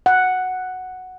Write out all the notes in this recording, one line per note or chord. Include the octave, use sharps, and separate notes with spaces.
F#5